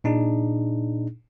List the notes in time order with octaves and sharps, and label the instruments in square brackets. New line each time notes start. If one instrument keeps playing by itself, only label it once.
[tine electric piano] A#2 D4 D#4 G#4